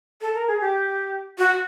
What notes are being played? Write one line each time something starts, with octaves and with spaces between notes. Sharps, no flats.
A4
A#4
G#4
G4
F#4